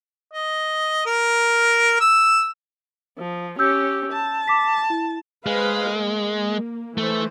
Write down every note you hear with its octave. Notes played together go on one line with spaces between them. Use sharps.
D#5
A#4
E6
F3
C#4 G4 E6 G6
A5
D6 B6
E4
G#3 B4 C5 F5
A#3
E3 A3 C5